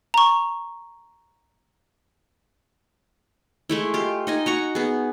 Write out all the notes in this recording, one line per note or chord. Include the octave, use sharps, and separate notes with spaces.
A#5 C#6
G#3 A3 E4
F4 G4
D#4 D#5 G#5
F#4 A#5 C#6
B3 G#4